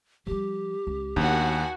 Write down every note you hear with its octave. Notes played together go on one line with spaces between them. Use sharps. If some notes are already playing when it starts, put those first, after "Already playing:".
F3 G3 G4
C#2
D#2 B3 D4 F#4 F#5 G#5